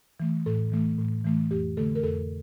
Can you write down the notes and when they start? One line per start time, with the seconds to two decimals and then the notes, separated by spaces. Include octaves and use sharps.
0.20 E3 A3
0.46 A2 A4
0.72 E3 A3
0.98 A2
1.25 E3 A3
1.51 F2 G4
1.77 D3 A3 A4
1.95 A#4
2.03 F2 A4